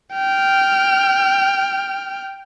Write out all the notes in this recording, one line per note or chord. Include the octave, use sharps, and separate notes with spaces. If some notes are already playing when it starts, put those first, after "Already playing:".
G5 F6